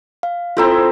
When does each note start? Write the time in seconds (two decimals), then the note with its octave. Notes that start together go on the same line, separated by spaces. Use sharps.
0.23 F5
0.57 C4 E4 F4 A4 C5 A#5